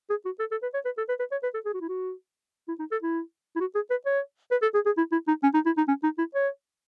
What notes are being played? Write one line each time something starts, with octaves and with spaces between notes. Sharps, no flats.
G#4
F#4
A4
A4
B4
C#5
B4
A4
B4
B4
C#5
B4
A4
G#4
F#4
E4
F#4
E4
D#4
A4
E4
E4
F#4
G#4
B4
C#5
B4
A4
G#4
G#4
E4
E4
D#4
C#4
D#4
E4
D#4
C#4
D#4
E4
C#5